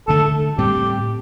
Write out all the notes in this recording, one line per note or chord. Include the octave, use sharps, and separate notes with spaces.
D2 D3 A3 A4
A2 G3 C4 G4